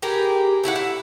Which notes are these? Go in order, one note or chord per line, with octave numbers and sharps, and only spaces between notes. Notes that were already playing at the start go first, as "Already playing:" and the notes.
G4 G#4 A#4 B4
A3 E4 B4 F#5
E4